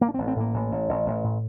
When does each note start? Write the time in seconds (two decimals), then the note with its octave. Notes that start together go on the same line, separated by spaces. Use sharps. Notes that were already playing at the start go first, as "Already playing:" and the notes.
0.01 A1 A#3
0.08 D4
0.14 C4
0.18 A1
0.27 C4
0.36 A2 A#3
0.54 A1
0.72 A1
0.89 A1
1.06 A1
1.24 A2